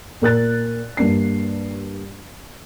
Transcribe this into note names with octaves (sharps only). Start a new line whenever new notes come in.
A#2 A#4 F#6 A6
G2 A#3 D4 C7